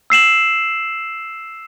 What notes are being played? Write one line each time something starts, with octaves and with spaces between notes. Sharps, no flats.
E6 C7 E7 F#7